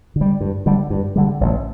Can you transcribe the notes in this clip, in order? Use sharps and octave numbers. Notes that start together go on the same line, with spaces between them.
D3
G3
G2
D3 G3
G2
D3 G3
A1